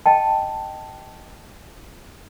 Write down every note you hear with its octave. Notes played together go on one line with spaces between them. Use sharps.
D#5 G5 A5